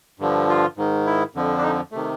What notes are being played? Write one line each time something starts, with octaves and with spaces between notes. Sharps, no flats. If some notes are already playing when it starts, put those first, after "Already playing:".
G2 D3 F3
F4
G#2 D#3
E4
F2 D3 F3
D4
D#4
C3 D#3 A3